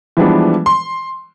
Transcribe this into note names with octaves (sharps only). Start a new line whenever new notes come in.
E3 F3 G3 G#3 B3 D4
C6